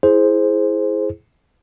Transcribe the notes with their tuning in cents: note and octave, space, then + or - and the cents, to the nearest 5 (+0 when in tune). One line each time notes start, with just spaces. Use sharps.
E4 +0 G#4 +15 C5 +0